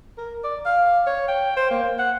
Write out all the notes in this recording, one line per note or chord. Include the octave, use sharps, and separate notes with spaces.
A#4
D5
F5
C#5
G5
C5
A#3
F#5